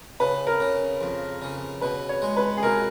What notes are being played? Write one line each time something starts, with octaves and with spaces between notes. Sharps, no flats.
C#3 B4
A#4
C#3
F2
C#3
B2 B4
C#5
G#3
B4
G#4
B2 A#4